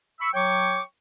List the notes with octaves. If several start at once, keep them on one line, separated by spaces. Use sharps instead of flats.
B5 C#6 E6
F#3 C#5 G5 C#6 D6